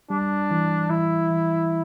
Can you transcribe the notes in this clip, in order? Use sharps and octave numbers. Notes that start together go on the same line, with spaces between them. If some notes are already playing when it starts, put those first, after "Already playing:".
G3 D4
E3
E3 E4
E3